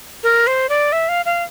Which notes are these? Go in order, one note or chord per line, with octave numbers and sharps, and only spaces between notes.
A#4
C5
D5
E5
F5
F5